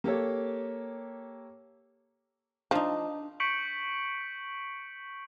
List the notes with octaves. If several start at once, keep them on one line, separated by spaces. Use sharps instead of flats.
A#3 G4 A4 C#5
F3 D4 D#4
C#6 G6 B6 C#7 D7 F#7